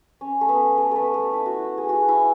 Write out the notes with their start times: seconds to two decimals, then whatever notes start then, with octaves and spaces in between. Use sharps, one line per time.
0.21 C#4
0.41 A3
0.49 B3
0.78 A3
0.91 A3 B3
1.14 A3
1.33 E4
1.46 F#4
1.59 E4
1.78 G#4
1.89 F#4
2.08 E4